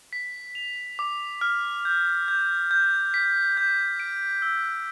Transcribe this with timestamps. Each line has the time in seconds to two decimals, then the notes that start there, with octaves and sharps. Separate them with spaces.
0.13 B6
0.55 F7
0.99 D6
1.41 F6
1.85 G6
2.28 G6
2.71 G6
3.14 B6
3.57 G6
4.00 D7
4.42 E6